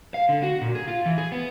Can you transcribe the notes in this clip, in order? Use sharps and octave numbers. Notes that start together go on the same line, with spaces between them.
F5
D3
F#4
A#2
G#4
F4
E3
G#4
B3